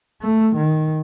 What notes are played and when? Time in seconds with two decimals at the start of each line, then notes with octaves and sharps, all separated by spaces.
0.22 A3
0.56 D#3